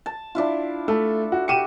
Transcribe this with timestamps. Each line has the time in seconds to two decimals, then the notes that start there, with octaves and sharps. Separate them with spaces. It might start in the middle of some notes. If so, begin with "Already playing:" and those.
0.06 A5
0.35 D4 E4 F4
0.88 A3 A4
1.32 F#4
1.48 F#4 G4 G5 C#7 D#7 E7